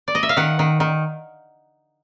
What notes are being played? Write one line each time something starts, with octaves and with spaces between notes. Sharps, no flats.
D5
D#5
E5
F5
D#3 F#5
D#3
D#3